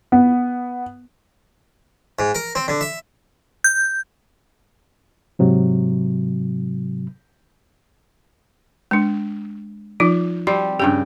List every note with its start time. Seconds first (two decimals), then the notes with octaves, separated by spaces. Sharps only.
0.12 B3
2.19 G#2
2.35 A#4
2.55 C4
2.68 D3
2.81 E5
3.64 G6
5.39 G#2 C3 F#3
8.91 G#3 D4
10.00 F3 D#4 F4
10.47 G3 C4 D5
10.80 G2 C#3 G4 G5